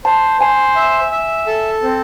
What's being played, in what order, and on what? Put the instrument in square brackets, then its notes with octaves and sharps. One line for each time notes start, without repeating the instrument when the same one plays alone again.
[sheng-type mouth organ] C5 [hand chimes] A5
[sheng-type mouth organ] C5 [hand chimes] G#5
[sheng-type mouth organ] E5
E5
A4
C4